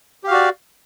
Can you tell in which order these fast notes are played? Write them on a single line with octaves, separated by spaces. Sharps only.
G4 F5 F#4 D5